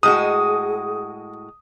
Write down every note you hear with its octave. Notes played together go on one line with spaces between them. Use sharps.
A2 G#3 F#4 G#4 D#6